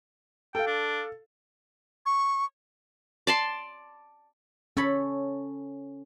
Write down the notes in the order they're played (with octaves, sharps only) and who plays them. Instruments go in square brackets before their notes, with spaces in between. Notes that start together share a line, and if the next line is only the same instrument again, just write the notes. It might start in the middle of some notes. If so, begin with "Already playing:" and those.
[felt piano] A4 F5 [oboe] G5
[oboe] D4
[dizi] C#6
[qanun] D5 A5 C6
[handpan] C#4 [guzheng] A4 C#5 B5